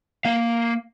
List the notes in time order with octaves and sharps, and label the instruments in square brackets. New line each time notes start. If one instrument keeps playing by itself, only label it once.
[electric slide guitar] A#3 F5